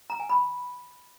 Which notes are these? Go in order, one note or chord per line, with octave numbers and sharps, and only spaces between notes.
A#5
G#5
B5